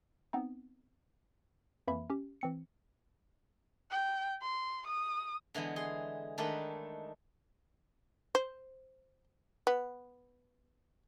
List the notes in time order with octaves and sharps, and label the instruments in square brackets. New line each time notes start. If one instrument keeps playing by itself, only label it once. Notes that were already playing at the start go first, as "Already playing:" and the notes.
[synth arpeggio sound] B3 C4 D#4
F2 E3 A#3 E5 B5
C#4 G4
E3 C4 C#7
[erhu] G5
C6
D#6
[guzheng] D3 E3 G#3 B3
G#4 C6
D#3 G#3 A3 D4 A4 B4
[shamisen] C5
B3